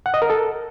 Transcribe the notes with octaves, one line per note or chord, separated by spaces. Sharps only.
F#5
D#5
A#4
A4